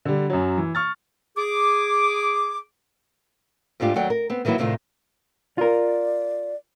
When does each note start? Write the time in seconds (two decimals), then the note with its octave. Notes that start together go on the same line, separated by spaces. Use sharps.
0.05 D3 G3
0.30 F#2 F#3
0.58 E3
0.75 C#6 F6 A6
1.37 G#4 D6
3.80 G#2 A3 D4 F4 G4
3.96 D#2 F#3 D5 F#5 G5
4.10 A#4
4.30 B3 C4
4.45 D#3 E3 F#3 A#3 E4
4.58 D2 A2 C3 D#3 F4
5.58 F4 A#4 D5